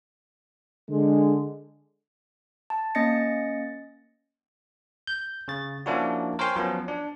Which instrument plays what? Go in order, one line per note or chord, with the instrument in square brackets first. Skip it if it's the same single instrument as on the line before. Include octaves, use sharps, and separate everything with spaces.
[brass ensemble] D3 G#3
[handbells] A5
A#3 C#4 D#5 A6 A#6 C#7
[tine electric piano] G6
C#3 A6
F3 A#3 C#4 D4 E4 F#4
A#4 C5 C#5 G5 G#5 C6
F3 F#3 B3 C#4
D4